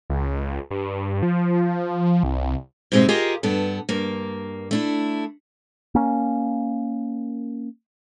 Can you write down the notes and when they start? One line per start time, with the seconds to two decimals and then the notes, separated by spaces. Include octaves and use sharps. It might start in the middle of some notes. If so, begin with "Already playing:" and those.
0.10 C#2
0.71 G2
1.23 F3
2.23 C2
2.92 G#2 B2 G#3 C4 G4 E5
3.09 F4 G4 G#4 A#4 D#5 F5
3.43 G2 B3 A4
3.89 G2 A#3
4.71 A3 D4 E4
5.95 A#3 C#4